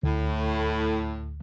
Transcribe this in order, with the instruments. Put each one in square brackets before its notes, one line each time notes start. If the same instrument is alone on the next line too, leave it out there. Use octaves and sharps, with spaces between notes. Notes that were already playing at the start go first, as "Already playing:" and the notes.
[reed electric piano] D2 [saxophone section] A2